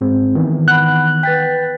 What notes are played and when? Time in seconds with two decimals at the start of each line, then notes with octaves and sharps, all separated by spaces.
0.01 G#2 G#3 C4
0.35 D#3 E3 B3
0.68 F#5 B5 F#6
1.23 B4 G5 A6 B6